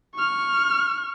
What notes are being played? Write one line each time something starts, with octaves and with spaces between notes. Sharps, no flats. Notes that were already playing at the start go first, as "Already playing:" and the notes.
C#6 F6